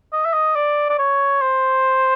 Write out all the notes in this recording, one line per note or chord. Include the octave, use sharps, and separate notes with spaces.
D#5
E5
D#5
D5
D5
C#5
C5